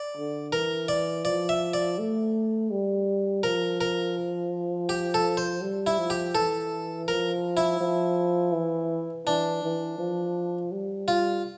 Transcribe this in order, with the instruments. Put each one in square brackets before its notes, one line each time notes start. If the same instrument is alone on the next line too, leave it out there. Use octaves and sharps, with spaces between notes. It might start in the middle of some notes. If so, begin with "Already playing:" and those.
Already playing: [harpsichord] D5
[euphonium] D3
[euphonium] E3 [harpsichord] A#4
[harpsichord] D5
[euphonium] F3 [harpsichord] D5
[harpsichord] E5
D5
[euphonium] A3
G3
[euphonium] F3 [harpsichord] A#4
[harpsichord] A#4
G4
A4
C5
[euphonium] G3
[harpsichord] E4
[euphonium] F3
[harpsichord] G4
[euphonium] E3 [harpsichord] A4
[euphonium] F3 [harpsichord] A#4
[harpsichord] E4
[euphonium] F3
E3
[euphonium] E3 [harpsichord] D4
[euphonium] E3
F3
G3
[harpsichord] F4